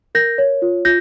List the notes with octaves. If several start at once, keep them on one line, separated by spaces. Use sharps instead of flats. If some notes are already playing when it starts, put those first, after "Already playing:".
A#4 G6 A#6
C#5
F4
F4 G6 A#6